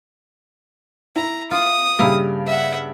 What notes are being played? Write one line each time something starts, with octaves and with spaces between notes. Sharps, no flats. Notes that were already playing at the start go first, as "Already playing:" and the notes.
E4 A#5
F4 D#6
G2 C#3 A#3 E4 G4 F5
E5 F#5